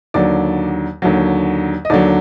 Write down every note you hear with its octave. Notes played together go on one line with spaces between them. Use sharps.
D#2 D3 F#3 D5
D#2 D3 F#3
D#5
D#2 D3 F#3 D5